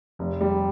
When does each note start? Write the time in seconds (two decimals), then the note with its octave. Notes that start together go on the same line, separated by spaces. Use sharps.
0.19 F1
0.41 G3